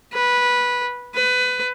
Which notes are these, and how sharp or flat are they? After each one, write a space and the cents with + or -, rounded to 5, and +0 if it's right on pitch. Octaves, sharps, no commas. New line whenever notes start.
B4 -10
B4 +20